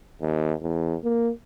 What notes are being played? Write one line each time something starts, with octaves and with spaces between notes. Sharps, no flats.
D#2
E2
A#3